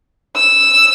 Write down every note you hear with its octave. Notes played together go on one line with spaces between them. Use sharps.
E6